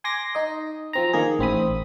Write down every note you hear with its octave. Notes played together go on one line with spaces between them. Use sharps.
G#5 C6 D6 A#6
D#4 D#5
F3 C4 A#5
D#3 A#3 G#4
A1 C4 B5 D#6